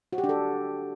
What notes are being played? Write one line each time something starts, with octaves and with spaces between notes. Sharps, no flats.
F#4
G4
D4
A4